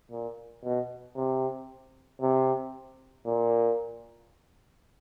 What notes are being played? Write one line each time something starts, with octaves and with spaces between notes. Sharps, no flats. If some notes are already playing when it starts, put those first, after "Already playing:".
A#2
B2
C3
C3
A#2